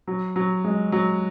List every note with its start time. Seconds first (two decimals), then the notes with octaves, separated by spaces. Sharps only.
0.08 F#3
0.36 F#3
0.64 G#3
0.92 F#3